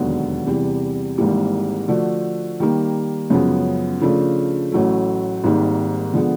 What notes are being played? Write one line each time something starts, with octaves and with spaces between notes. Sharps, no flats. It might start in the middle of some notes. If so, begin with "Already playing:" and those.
Already playing: E1 D#2 D3 F#3 B3
E2 C3 E3 G3
G#1 G#2 E3 G3 A#3
D3 F3 A3 D4 F#4
D#3 G3 A#3
F#2 C#3 F3 G#3 B3
C#3 F3 A3 D4 F4
A1 A2 F#3 A3
G#1 G#2 D#3 G3 A#3
D3 F3 G#3 B3